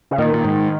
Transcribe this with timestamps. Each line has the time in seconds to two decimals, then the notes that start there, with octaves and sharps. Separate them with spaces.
0.11 C#3
0.18 A#2 D#3
0.33 A#2
0.44 G#2